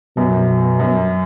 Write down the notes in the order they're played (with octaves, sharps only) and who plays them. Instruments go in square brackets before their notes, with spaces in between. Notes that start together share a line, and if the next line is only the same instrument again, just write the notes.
[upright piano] F#2 [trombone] B2
[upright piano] F#2